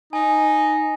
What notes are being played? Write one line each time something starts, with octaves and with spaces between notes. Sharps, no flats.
D#4 G#5